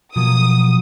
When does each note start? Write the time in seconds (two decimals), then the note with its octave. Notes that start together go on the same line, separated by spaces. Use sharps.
0.16 B2 F3 F#3 A#3 D#6